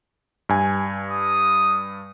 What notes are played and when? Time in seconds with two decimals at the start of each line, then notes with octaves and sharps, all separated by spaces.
0.49 G2 G#5
1.10 D#6